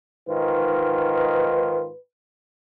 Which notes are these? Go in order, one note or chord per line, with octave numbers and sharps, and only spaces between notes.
G#2 D#3 F4 B4